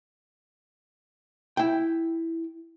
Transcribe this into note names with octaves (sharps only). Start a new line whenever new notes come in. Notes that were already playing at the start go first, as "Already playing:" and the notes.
E4 G5